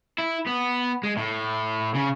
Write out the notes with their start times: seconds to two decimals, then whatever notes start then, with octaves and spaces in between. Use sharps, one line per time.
0.18 E4
0.46 B3
1.03 G#3
1.17 A2
1.94 C#3